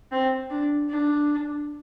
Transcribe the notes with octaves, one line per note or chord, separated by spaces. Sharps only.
C4
D4
D4